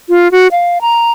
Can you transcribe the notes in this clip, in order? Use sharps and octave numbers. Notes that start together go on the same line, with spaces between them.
F4
F#4
F5
A#5